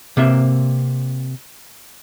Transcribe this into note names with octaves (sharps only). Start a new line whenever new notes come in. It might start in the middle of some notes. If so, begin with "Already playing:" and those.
C3 A#3 E5